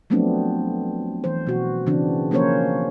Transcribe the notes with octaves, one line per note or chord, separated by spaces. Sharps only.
F3 F#3 A3 B3 C4 D4
E3 C5
B2 F#4
C#3 E3 C4 D4
F3 A#3 C#4 A#4 C5 C#5